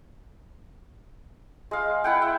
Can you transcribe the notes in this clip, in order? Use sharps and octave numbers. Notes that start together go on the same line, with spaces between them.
G#3 F5
E4 F#5 G5
E5